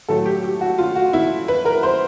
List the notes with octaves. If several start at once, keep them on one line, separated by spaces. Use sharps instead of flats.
A2 F#3 A3 A4
G4
G4
F#4
F4
F#4
E4
B4
A#4
C5